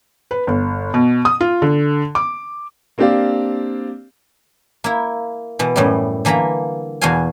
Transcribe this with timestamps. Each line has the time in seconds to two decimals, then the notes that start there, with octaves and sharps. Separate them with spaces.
0.31 B4
0.47 G1
0.94 B2
1.25 D#6
1.41 F4
1.62 D3
2.15 D6
2.98 A#3 C4 D4 G4 D5 F5
4.84 A#3 E4
5.59 B2 E3
5.76 F#2 A2 E3 G3
6.25 D3 E3 A#3 A#5 B5
7.01 E2 B2 F#4 F5 G#5